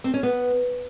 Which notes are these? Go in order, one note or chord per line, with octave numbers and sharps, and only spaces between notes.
C4
C#4
B3